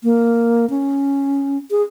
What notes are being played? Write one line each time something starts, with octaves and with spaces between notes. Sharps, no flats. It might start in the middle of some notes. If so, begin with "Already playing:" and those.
A#3
C#4
G#4